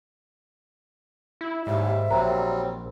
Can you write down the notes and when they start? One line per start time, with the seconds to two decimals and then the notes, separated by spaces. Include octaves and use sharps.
1.41 E4
1.67 D#2 G#2 G3 E5
2.10 A#1 F#3 G3 C4 A#4 C5 A#5